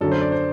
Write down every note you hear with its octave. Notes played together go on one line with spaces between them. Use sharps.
F#2 D3 F#3 A4
C5
D5
C5